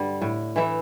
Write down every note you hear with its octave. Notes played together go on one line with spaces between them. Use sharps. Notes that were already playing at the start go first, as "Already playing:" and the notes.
Already playing: G2 D3 G3
A2
E3 A3 E4